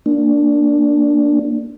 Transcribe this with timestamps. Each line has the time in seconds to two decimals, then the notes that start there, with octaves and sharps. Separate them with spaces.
0.06 A#3 D4